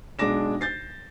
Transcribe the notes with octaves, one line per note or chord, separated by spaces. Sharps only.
B1 G#3 D4 D6 A#6 E7
G6 A6 C7